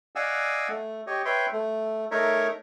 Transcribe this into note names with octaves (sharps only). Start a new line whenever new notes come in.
D5 D#5 F5 F#5 G#5 E6
A3
G4 C#5 D#5
B4 C#5 E5 G5 C6
A3
A3 D#4 A#4 C#5 E5